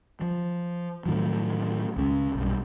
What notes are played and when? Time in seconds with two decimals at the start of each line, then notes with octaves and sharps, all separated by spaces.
0.21 F3
1.06 A2 D#3 E3 F#3
1.96 C#2 C#3
2.35 B1 G2